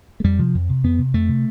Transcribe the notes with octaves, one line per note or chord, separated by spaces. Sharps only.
A3
F2 G3
C3 F3
F2
C3
F2 B3
C3
F2 A3
C3